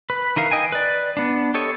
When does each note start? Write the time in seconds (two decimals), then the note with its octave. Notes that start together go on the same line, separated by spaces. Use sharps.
0.10 B4
0.36 E3 D#4 A#4 F5
0.51 D#5 G5 G#5
0.72 B4 D5
1.17 B3 D4
1.54 G4 A4 C#5 D#5